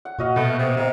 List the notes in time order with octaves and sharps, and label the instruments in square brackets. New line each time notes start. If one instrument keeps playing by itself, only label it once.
[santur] F#5
[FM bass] A#2 [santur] F#4 D#5 F5
[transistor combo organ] B2 [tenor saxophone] A3 [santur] B4 F5
[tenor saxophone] C3
[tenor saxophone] C3 [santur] A#3 D#5